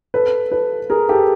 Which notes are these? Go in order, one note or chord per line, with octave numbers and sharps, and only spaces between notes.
A4 B4
A4 B4
G#4 A#4
G4 A4